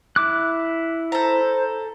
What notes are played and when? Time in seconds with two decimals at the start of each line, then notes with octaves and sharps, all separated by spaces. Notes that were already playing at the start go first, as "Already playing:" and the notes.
0.16 E4 D6 F#6
1.12 A4 C5 A#5